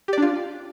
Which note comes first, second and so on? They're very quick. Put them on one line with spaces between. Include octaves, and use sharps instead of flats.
G4 D5 D4 F4